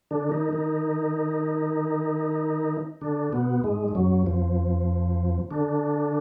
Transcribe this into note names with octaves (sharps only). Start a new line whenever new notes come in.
D3 D4
D#3 D#4
D#3 D#4
D3 D4
B2 B3
G#2 G#3
G#3
F#2 F#3
F2 F3
D3 D4